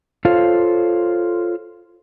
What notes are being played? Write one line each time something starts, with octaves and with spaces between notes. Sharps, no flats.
F4 A4 C5 C#5 F5